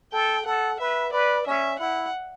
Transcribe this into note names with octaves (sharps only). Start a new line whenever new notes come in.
A4 G5
A4 F#5
B4 E5
B4 D5
C#4 E5
E4 F#5